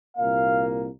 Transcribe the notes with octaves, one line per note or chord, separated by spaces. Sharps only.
C2 A#2 A#3 F5